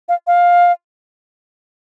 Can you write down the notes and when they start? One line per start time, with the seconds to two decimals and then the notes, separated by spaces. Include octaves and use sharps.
0.09 F5
0.27 F5